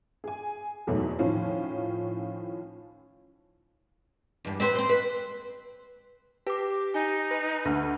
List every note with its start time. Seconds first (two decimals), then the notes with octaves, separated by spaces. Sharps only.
0.24 G#4 G#5
0.87 E2 G#2 B2 F#3 A3
1.19 A2 D#3 F3 C#4 F4
4.45 E2 G2
4.60 C4 B4 C5
4.75 C4 C5
4.89 B4
6.47 G4 B4 D6
6.94 D#4 G#5
7.31 B4
7.65 D2